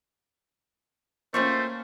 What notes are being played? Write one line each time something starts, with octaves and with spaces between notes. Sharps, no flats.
A3 A#3 C4 C#4 F4 C5 C#6